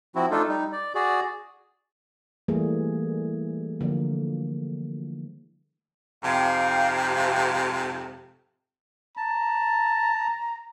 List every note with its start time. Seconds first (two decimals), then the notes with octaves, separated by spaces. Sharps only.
0.16 F3 C4 E4 F#4
0.31 A3 D4 D#4 F4 A4
0.49 G3 D#4
0.72 D5
0.95 F#4 G#4 D5
2.48 E3 G3 A3 A#3 G#4
3.81 D3 F3 A#3
6.23 F2 G#2 C3 F5 G5
9.17 A5 A#5